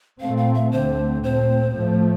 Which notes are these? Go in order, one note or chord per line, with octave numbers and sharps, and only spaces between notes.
A#2 A3 C4 F5
F5
E5
D2 D3 A3 C4 C5
A#2 A3 C4 C5
A2 F3 A3